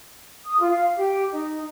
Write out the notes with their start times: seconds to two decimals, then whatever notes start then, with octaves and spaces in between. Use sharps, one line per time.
0.45 D#6
0.59 F4
0.71 F5
0.96 G4
1.31 D#4